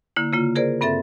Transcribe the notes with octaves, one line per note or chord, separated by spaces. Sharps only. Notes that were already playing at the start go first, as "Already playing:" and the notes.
D3 A#3 E4
C#3 A#3 F4
G#4 A#4 C5 D5
G2 C4 A4 E5 A6